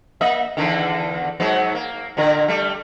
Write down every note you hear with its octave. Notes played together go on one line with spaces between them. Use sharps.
A#3 D#5 E5
E2 D3 D#3
G#2 F#3 B3
A#3
A#2 D3 A#4
G3 A3